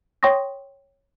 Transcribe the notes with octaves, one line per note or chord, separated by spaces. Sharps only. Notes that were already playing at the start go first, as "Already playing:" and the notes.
C#5 G5 C6 C#6 D#6 A#6